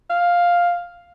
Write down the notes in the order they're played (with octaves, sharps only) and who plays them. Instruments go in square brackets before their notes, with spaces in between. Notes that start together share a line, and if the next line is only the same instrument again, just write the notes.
[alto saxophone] F5